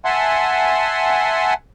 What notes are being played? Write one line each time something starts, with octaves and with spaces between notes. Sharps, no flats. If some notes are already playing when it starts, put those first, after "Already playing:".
E5 F#5 G#5 A5 C6